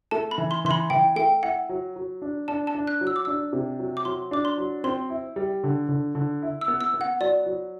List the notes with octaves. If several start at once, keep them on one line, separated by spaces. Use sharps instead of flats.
A3 A5
B5
E3
C6
E3 C6
B5
E3 G5
A3 G5
E4 F#5
F#3
F#3
D4
D4 A5
A5
D4
F#6
F#3
E6
D6
D4 E6
C3
F#3
D6
F#3 C6
D4 D6
C6
F#3
C4 C6
E4
G3
D3
D3
D3
E4
E6
B3
E6
B3
F#5
F#3 D5
F#3